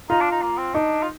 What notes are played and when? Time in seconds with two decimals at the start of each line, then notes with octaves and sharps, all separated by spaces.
0.09 D#4 F4
0.21 D4
0.31 D#4
0.42 A#3
0.58 C4
0.74 D4 D#4
1.03 F4